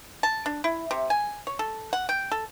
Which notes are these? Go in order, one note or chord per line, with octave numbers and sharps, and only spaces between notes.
A5
D4
E4
C3
G#5
C#5
A4
F#5
G5
A4